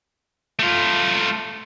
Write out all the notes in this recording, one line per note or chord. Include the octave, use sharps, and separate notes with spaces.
A3 F4